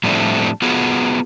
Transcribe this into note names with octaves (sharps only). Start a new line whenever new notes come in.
A2 F3 G3 A3 C4 D4
B3 F4 F#4 G#4